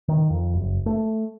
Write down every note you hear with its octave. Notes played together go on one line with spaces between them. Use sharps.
D#3
F2
F#1
A3